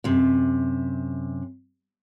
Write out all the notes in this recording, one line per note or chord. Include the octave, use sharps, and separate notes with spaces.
F#2 C3